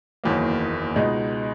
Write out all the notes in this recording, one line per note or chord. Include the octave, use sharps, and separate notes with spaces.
F#1 E2 D#3 F#3 A#3
C#2 B2 G#3 D#4